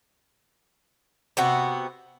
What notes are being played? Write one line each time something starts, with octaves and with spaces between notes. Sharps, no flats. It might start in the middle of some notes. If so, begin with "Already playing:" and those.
C3 B3 F#4